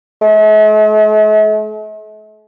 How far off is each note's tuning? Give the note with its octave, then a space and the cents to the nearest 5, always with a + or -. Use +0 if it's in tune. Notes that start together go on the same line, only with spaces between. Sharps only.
A3 -45